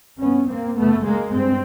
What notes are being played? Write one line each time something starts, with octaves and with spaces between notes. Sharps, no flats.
G2 B3 C#4
A#3 C4
F#2 C#3 A3 B3
G#3 A#3
G2 C4